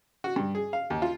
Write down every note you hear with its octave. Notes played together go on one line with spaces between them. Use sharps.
F#4
G2
G#4
F5
D#2
F4